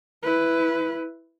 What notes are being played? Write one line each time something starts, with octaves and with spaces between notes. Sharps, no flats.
E4 B4